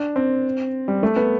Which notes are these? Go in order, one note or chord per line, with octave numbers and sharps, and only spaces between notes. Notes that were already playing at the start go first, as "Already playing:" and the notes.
Already playing: D4
C4
G3
A3
B3